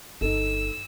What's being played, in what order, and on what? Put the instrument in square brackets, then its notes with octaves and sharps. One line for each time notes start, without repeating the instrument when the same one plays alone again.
[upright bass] G1 [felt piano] D#4 A4 [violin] E6